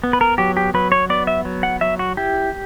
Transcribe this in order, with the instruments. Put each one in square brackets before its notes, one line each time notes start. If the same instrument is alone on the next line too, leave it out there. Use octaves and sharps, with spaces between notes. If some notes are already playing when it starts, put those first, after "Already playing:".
[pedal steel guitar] B3
B4
A#4
F#3 G4
G4
F#3 B4
C#5
B3 D5
E5
F#3
F#5
F#3 E5
F#4
E4 G4